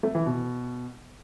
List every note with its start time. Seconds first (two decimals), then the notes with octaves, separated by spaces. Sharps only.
0.03 A3
0.15 E3
0.26 B2